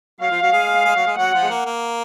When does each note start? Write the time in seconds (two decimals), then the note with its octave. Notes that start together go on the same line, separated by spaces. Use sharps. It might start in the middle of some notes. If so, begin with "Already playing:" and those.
0.20 F#3 F#4 F5
0.31 F3 F4
0.42 F#3 F#4
0.53 G#3 G#4
0.85 G#3 G#4
0.96 F#3 F#4
1.06 G#3 G#4
1.17 F#3 F#4 F#5
1.34 F3 F4
1.42 G#3
1.50 A#3
1.66 A#3